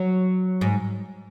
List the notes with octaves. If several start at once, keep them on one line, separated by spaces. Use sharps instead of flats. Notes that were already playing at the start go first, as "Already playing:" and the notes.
Already playing: F#3
G#2